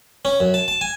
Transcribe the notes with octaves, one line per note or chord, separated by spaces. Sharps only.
C#4
F#2
A5
A5
G#5